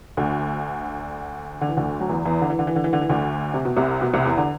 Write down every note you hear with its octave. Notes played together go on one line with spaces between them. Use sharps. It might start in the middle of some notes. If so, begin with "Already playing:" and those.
D2 D3
D3
E3
D2 D3
F#3
E2 E3
E2 E3
D3
E3
D3
E3
D3
E3
D3
E3
D2 D3
C3
B2
C2 C3
B2
C2 C3
E2 E3
D3